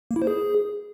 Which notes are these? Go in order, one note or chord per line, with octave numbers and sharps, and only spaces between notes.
A#3
E4
C5
G#4